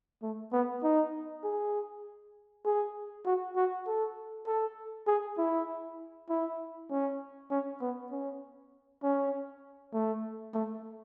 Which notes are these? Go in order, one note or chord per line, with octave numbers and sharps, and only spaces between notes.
A3
B3
D#4
G#4
G#4
F#4
F#4
A4
A4
G#4
E4
E4
C#4
C#4
B3
C#4
C#4
A3
A3